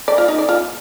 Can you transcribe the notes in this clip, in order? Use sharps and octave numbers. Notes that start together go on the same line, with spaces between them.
D5
F4
D#4
D5
F4